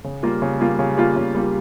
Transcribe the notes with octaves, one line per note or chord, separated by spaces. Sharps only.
C#3
G3 A#3 F4
C#3
G3 A#3 F4
C#3
G3 A#3 F4
C#3
G3 A#3 F4